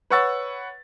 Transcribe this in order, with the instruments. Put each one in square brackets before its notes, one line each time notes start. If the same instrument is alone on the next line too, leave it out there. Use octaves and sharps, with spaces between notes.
[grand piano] B4 C#5 F#5 C#6 E6 A6